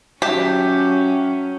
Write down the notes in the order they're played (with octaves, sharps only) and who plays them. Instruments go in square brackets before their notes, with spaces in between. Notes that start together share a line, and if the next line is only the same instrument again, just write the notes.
[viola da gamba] F#3 C#4 [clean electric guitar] F#4 E5 A5 [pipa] G4